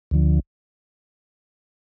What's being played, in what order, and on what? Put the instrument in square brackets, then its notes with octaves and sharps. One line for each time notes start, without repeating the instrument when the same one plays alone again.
[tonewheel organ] D2 D3 F3